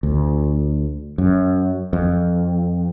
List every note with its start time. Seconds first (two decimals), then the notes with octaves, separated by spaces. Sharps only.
0.03 D2
1.18 F#2
1.93 F2